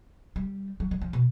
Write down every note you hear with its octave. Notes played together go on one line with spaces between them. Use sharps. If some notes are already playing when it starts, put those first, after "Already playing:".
G3
F#3
F#3
F3
B2